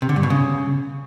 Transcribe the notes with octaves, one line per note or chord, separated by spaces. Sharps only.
C3
D3
G2
B2
C#3